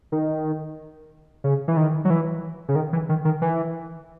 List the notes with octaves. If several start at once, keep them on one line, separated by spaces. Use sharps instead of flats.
D#3
C#3
E3
D#3
F#3
E3
C#3
D#3
E3
D#3
D#3
E3